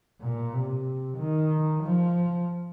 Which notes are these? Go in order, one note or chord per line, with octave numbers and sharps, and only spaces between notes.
A#2
C3
D#3
F3